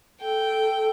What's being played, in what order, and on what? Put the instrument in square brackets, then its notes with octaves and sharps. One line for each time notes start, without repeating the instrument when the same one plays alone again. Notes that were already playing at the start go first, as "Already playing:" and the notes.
[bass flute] A4 [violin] G5